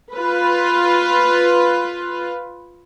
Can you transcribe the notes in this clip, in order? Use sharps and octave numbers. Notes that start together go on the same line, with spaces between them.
F4 B4